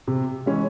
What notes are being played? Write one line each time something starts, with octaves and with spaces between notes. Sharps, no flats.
C3
E3 G#3 C#4